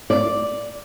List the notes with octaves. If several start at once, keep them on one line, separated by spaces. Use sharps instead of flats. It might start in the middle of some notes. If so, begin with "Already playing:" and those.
D5